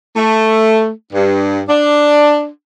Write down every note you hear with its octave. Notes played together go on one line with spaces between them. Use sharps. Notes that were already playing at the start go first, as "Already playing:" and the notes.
A3
G2
D4